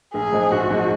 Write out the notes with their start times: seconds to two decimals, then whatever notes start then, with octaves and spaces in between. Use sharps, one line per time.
0.14 A#1 G#4
0.33 G#2 F3 G#3 D#4
0.52 A#1 F#4
0.70 G#2 F3 G#3 D#4